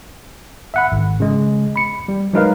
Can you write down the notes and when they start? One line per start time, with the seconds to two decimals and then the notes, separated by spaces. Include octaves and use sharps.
0.74 E5 F#5 B5
0.92 G#1
1.20 C#3 G#3
1.76 B5 C#7
2.08 G3
2.33 F#3 G#3 D#4 A#4 B4 F5